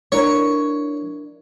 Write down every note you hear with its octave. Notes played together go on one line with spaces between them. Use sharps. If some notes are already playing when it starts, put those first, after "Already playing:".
D4 E4 A#4 C#5